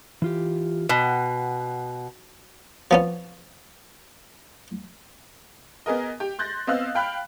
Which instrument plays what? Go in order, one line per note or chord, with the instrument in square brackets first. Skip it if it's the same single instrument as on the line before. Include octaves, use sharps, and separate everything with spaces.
[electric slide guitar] E3 F4 G4
[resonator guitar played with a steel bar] B2 [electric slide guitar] F#5 G5
[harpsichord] F3 B3 C#4
[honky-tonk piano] B3 G#4 A#4 D#5
G4
C6 F#6 G6 A6 A#6
B3 C4 D#5 F5 E6 F#6
F5 G5 B5 F6 F#6